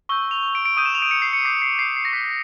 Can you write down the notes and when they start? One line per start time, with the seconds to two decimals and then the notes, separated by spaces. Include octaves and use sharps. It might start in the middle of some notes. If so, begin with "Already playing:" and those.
0.09 C#6 E6 G6 G7
0.31 F7
0.55 D7
0.65 D7
0.77 D#6 G6 D#7
0.85 E7
0.95 F7
1.02 D7
1.11 C#7
1.22 C7
1.33 C#7
1.45 D6 G6 C7
1.62 C7
1.79 C7
1.96 C7
2.05 A#6
2.13 C#6 F#6 B6